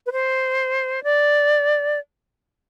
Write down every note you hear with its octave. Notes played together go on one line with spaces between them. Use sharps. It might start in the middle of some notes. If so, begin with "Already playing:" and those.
B4
C5
D5